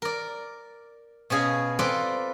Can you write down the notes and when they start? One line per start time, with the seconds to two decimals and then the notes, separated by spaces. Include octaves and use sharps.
0.02 A#4 D5
1.30 B2 C#4 G#4 F5
1.79 C4 F4 A4 B4 D5 C6